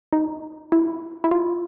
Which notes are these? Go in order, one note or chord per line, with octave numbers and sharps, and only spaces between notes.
D#4
E4
E4
F4